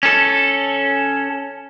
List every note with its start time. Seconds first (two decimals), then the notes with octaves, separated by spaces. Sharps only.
0.03 C#4 A4